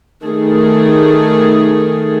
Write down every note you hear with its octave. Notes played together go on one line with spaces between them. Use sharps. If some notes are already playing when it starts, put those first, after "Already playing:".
D#3 A3 G#4 A4